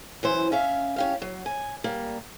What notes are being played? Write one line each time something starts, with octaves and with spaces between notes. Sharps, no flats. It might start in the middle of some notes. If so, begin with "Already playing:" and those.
F#2 E3 C5
C#4 E5 F5
C#4 G4 F5
F#3
G#5
G3 A#3